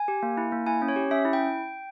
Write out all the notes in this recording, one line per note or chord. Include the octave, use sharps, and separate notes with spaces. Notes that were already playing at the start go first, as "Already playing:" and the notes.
Already playing: G#5
G4
A#3
E4
A#3
E4 G#5
C#4
C#5
G4
C#4 E5
E4
G5